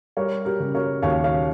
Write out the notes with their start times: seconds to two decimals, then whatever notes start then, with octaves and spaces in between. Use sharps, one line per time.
0.17 G3 A#4 C#5
0.45 G4 A#4
0.60 C#3
0.75 A#4 C#5
1.02 D#2 C#5 F5
1.24 C#5 F5